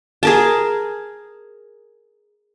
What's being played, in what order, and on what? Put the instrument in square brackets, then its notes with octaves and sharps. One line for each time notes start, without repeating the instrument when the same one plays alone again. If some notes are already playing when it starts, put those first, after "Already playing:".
[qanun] G#4 A#4 A5